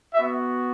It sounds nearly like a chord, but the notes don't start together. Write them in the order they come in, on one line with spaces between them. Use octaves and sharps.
F#4 E5 B3